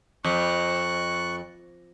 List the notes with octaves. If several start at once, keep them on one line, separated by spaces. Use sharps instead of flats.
F2 C#6 F#6